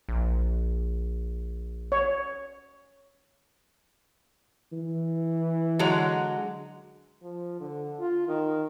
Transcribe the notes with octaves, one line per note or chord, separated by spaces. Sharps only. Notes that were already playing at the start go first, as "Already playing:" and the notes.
A#1
C#5
E3
D3 F#3 G#3
F3
D3
F4
D#3